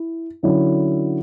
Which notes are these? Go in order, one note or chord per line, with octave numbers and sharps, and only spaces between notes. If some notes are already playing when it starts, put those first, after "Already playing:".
Already playing: E4
D3 F#3 C#4 E4